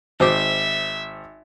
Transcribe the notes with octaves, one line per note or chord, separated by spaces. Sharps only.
G#1 C5 E5 D6